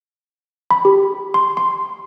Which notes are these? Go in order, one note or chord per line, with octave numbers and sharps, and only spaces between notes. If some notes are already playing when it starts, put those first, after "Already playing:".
B5
G4
C6
C6